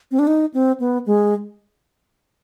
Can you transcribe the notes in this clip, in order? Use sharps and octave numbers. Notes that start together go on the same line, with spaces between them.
C4
D4
D#4
C4
B3
G#3